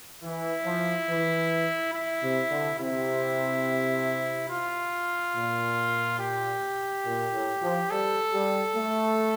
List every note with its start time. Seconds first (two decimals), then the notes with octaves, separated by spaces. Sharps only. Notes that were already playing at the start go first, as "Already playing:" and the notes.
0.23 E3 E4
0.65 F3
1.08 E3
1.94 E4
2.22 C3
2.50 D3
2.79 C3 E4
4.49 F4
5.35 A#2
6.20 G4
7.05 A#2
7.33 A2
7.62 F3
7.90 G3 A4
8.32 G3
8.76 A3